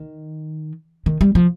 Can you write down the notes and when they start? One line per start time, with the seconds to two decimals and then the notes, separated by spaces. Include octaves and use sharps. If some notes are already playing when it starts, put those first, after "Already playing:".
Already playing: D#3
1.06 D#3
1.21 G3
1.35 F3